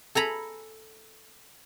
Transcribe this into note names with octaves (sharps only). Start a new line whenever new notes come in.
A4 G#5 A#5 B5